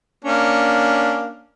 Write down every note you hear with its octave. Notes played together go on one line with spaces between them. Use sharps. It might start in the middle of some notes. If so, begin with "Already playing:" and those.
A#3 C#4 D4